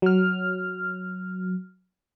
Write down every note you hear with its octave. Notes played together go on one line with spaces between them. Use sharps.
F#3 F6